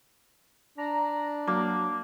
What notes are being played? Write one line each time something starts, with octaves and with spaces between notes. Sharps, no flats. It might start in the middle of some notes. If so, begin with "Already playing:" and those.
D4 A#5
F#3 A#3